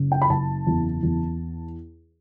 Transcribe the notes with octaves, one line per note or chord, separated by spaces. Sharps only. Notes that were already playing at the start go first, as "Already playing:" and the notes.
Already playing: F#1 C#3
G5
B5
F#1 A5
E2
E2